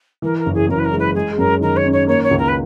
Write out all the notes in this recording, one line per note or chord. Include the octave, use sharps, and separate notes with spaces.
E3 A#4
A#4
F#1
G#4
F#2 A#4
B4
A#4
G#3
B4
G#3 G#4
F#2 A#4
D#3 A#4
C#5
C#4
C#5
A#3 C#5
C#5
C#2
A#4
B4